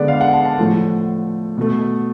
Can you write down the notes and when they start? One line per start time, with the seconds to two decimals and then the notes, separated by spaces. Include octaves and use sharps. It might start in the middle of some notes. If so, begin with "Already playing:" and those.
Already playing: D3 G#3 B3 D5
0.08 F5
0.21 F#5
0.33 A5
0.45 A5
0.58 A2 F3 A3
1.57 B2 A3